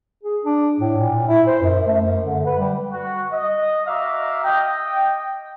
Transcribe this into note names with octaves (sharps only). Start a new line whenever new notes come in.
G#4
D4
A2
A#2
E4
C5
F#2
A3
F#2
D3
B4
G3
F#4
D#5
F#4 E5 F5 A#5 D6
D#5 G5